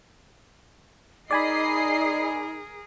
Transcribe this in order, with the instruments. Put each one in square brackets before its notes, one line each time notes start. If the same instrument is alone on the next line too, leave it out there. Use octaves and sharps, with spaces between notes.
[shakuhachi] D#4 [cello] G#4 A#4 [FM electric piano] D5 G#5 B5 [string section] D#5 C7